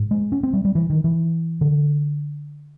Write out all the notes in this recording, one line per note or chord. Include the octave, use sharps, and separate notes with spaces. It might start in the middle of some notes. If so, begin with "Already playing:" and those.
Already playing: G#2
G#3
C#4
C4
G3
G3
E3
D#3
E3
D3